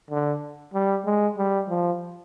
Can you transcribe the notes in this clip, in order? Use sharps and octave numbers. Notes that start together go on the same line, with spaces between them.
D3
G3
G#3
G3
F3